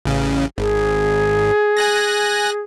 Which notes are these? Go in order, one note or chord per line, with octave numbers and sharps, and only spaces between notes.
A1 C#3
G#1 G#4
G#5 F#6 A#6